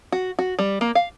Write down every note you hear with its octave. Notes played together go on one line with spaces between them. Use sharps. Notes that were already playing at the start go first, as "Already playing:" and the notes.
F#4
F#4
G3
A#3
F5